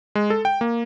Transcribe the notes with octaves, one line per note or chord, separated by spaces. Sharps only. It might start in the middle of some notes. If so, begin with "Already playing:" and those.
G#3
A4
G5
A#3